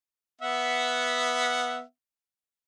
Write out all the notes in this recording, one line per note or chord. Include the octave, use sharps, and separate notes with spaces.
B3 E5 F#5